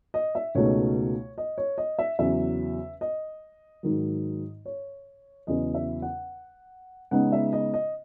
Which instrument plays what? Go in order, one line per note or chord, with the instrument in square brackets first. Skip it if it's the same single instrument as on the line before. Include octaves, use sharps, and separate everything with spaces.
[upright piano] D#5
E5
C#2 B2 A3 D#4 C#5
D#5
C#5
D#5
E5
E2 C#3 F#3 E5
D#5
G#2 D#3 F#3
C#5
E2 C#3 F#3 D#5
E5
F#5
C#3 G#3 B3 D#4 F#5
E5
D#5
D#5